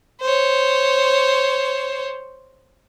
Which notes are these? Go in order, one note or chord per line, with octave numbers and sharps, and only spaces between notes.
C5 C#5